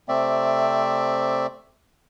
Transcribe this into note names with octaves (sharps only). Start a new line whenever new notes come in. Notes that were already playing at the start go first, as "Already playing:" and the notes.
C3 A3 C4 D5 E5